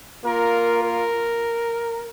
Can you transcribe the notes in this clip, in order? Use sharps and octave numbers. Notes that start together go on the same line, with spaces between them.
A#3 F4 A#4
A#4